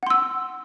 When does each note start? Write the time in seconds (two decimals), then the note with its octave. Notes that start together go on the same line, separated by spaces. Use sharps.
0.03 F#5
0.07 C6
0.10 E6